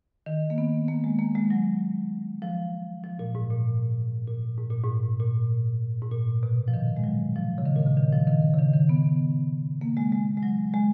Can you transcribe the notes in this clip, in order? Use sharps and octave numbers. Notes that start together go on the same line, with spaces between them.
D#3
A#3
B3
A#3
G#3
A#3
G#3
F#3
F3
F3
A#2
G#2
A#2
A#2
G#2
A#2
G#2
A#2
G#2
A#2
B2
F3
D#3
G#3
F#3
F3
C#3
D#3
A#2
C#3
D#3
F3
D#3
C#3
D#3
D#3
B3
A#3
G#3
G#3
G#3
F#3
G#3